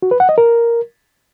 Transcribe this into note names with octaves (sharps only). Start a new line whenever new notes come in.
F#4
B4
F#5
D#5
A#4